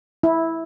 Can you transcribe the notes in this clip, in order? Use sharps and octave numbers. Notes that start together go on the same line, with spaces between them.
E4